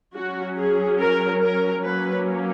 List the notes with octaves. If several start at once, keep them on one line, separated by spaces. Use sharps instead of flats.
F#3 C#4 F#4
G#4
A#4
A#4
F#3 A#3 C#4 B4